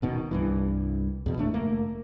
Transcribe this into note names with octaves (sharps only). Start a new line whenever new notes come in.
D#1 B2 D#3
C2 G2 E3
E2 B2
G#1 A2 A3 D4
F#1 A3 A#3